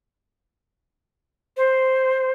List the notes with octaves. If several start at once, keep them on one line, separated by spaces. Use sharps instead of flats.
C5